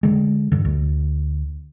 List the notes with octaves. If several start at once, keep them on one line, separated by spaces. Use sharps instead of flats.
D3 G#3
G2 D3
D2